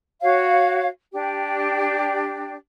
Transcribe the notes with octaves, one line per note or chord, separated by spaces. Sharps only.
F#4 C#5 F5
D4 G4